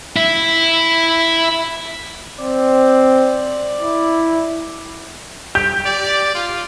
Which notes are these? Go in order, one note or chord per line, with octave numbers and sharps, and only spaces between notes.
E4
C4 D5
E4
G4 G6
D5
F4